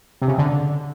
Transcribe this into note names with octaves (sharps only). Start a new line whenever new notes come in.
C3
C#3
D3